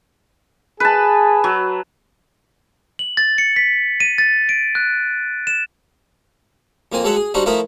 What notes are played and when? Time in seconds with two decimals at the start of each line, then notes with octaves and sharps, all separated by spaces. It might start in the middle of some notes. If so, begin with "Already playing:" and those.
0.80 G#4 B4 A5
1.44 F#3
2.99 F#7
3.17 A6
3.38 C#7
3.56 B6
4.00 D#7
4.18 A6
4.49 D7
4.75 F#6
5.47 E7
6.92 F2 A#3 C4 G#5
7.04 F#3 G#3 A4 C#5 E5 F#5
7.16 G#4
7.34 G3 C4 D4 D#4 F#4
7.46 F3 A3 E4 A#4 E5 D#6